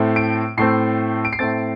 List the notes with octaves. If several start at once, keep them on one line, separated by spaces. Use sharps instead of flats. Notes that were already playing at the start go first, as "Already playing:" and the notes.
Already playing: A2 A3 C4
D7
A2 A3 C4 C7
D7
C7
A2 A3 C4 A6